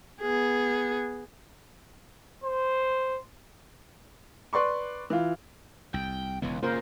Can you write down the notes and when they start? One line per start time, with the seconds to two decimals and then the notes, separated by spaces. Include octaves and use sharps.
0.21 B3 G#4
2.44 C5
4.53 B4 D5 C6 C#6
5.10 E3 F4
5.94 C2 G5
6.42 E1 C#2 E3 B3
6.63 A#2 C#3 A#3 F4 A#4 C5